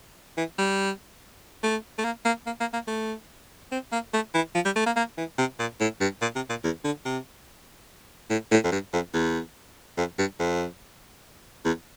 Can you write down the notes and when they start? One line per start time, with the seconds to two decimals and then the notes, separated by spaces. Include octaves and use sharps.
0.37 E3
0.59 G3
1.63 A3
1.98 A3
2.04 A#3
2.25 A#3
2.46 A#3
2.60 A#3
2.74 A#3
2.88 A3
3.72 C4
3.92 A#3
4.14 A3
4.35 E3
4.55 F3
4.65 G3
4.76 A3
4.86 A#3
4.96 A#3
5.18 E3
5.38 C3
5.59 A#2
5.81 A2
6.01 G2
6.22 A#2
6.36 C3
6.50 A#2
6.64 E2
6.84 D3
7.05 C3
8.30 A2
8.52 A2
8.64 F2
8.72 G2
8.93 F2
9.14 E2
9.97 F2
10.19 G2
10.39 F2
11.65 E2